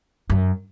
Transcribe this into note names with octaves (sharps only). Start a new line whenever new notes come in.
F#2